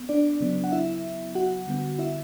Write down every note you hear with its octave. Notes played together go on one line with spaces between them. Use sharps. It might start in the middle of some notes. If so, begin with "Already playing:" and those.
Already playing: B3
D4 D5
C#3 F#3 B3
F#5
E4 E5
F#4 F#5
D3 G3 B3
E4 E5